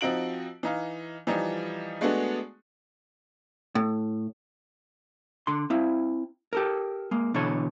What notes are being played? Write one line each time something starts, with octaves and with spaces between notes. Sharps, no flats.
F3 C4 D#4 F#4 D7 F#7
E3 D#4 F5
E3 F3 G3 D#4
G#3 A3 B3 D4 F#4 G#4
A2
D3 C6
C4 E4 F5
G4 A4 A#4
G#3 A#3
B2 D3 E3 A4 C#5